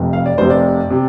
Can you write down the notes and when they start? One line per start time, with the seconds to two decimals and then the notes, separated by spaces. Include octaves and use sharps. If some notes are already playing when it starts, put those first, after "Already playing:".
Already playing: F1 F2 C3
0.13 F5
0.26 D5
0.38 F1 F2 C3 C5
0.50 D5
0.91 C3